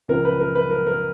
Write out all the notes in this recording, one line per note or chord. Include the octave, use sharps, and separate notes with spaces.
C#2 C#3 F3 A#4
B4
A#4
B4
A#4
A#4